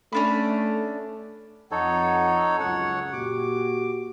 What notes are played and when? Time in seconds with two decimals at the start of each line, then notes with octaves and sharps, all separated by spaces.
0.13 A3 C#4 D4 B5
1.71 F2 D#4 A4 C#5 F#5
2.60 C#2 F#2 C#3 C#5 F#5
3.13 A#2 F#4 G4 D6